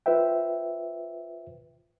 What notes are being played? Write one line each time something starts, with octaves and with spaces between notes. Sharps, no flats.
F4 B4 C5 E5 G5